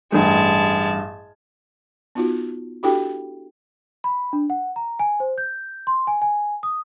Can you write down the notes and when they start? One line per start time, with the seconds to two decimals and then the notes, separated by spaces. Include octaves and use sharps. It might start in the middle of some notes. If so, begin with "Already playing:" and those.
0.12 A1 G2 G#3 A5
2.15 B3 D#4 F4 F#4
2.83 D4 E4 F#4 G4 A4 G5
4.04 B5
4.33 D4
4.50 F#5
4.76 A#5
4.99 G#5
5.20 C5
5.38 G6
5.87 C6
6.07 G#5
6.22 G#5
6.63 D#6